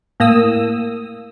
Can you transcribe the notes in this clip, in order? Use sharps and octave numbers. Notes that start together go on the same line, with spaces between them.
A2 A#3 D#6 E6